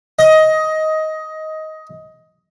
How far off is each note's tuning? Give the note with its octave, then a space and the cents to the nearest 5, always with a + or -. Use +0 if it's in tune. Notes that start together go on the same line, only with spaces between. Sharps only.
D#5 +15